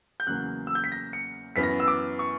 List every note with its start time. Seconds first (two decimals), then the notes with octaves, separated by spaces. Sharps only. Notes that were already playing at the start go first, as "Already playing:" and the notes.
0.20 G6
0.27 E2 C#3 F#3 A#3 F#6
0.67 E6
0.75 G6
0.84 B6
0.92 A#6
1.13 C#7
1.56 F#2 E3 B3 B6
1.63 A#6
1.80 E6
1.88 D6
2.19 C#6